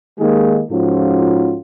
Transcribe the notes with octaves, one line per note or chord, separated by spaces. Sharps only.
D#3 G#3 A#3 D#4 G4 G#4
G#2 F3 C#4 F4 F#4 A4